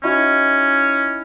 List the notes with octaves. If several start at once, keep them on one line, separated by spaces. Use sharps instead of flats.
C#4 D#4 E4 F#4